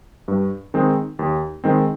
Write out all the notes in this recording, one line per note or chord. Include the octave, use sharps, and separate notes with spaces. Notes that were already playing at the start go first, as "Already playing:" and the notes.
G2
D#3 G#3 C4 D#4
D#2
D#3 G#3 C4